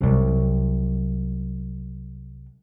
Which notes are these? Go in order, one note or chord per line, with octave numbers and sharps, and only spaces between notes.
C2 F#3